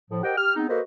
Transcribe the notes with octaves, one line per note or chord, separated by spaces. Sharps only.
A2 F3
G4 A#4 C5 D#5 F#5 G5
G4 F6
G#3 B3 C4 D#4
A#3 F#4 A4 B4 C5 D#5